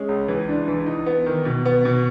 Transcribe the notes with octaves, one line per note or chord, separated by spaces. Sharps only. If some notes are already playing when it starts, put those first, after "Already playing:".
Already playing: G#3 C#4
C#2
E3
D4
E3
D#4
B3
D#3
B2
B3
B2